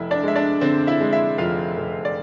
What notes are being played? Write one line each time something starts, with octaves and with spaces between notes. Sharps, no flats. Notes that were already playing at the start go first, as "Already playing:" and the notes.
Already playing: F1 E4 E5
D4 D5
G#3 E5
D4 D5
D3 C4 C5
E4 E5
G#3
E4 E5
F1 F4 F5
F1
D5